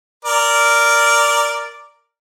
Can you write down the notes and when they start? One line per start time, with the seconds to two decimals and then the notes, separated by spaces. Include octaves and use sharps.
0.25 A#4 D5